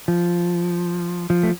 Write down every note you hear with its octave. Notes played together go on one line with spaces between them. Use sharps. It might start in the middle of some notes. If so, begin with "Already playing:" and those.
F3
F3
A3